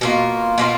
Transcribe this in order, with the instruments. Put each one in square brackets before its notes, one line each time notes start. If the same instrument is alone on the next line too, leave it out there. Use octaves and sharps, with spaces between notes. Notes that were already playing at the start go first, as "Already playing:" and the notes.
[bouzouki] B2 A#3 F4
B2 A#3 F4